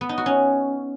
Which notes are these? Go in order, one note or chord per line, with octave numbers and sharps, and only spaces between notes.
B3
D#4
F#4
C#4